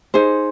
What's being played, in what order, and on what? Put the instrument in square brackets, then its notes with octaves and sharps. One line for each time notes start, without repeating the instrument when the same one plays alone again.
[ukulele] D#4 G#4 C5